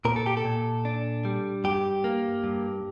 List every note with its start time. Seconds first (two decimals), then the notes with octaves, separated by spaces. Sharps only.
0.05 A#2 A#4
0.16 A4
0.26 G4
0.37 A4
0.45 A#2
0.85 D4
1.25 G3
1.64 G2 G4
2.04 A#3
2.44 G2